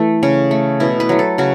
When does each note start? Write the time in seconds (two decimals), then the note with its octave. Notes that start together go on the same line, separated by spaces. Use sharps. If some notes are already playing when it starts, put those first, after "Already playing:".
Already playing: E3 A3
0.23 C#3 C#4
0.51 A3
0.80 B2 E4
1.00 B4
1.09 F#3 A3
1.19 A4
1.38 C#3 F#4